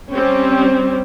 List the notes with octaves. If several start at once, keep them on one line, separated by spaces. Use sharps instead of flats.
G3 C4 C#4